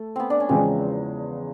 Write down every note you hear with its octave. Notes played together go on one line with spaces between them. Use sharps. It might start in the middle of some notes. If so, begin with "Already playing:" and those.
Already playing: A3 A4
B3 C4
D4
C#4
E2 C#3 F3 G#3 C4